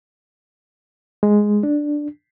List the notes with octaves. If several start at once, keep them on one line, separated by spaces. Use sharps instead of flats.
G#3
D4